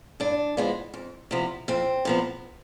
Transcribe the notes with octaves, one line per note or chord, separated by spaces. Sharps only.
G2 D4
F3 G#3 B3
F2
C3 F3 B3
F2 C4
C3 F3 B3